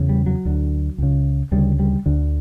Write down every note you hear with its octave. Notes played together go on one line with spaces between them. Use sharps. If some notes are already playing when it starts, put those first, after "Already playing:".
Already playing: E2 C#3
G3
F#3
D2 D3
C#2 C#3
D2 C#3 G3
G3
D2 D3